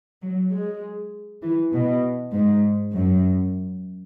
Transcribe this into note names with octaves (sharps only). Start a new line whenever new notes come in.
F#3
G#3
E3
B2
G#2
F#2